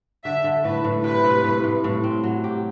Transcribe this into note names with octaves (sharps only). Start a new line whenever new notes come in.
D3 E5
D3
A2 B4
A2
C3 B4
C3
A2
A2
A2
C4
F#3
G4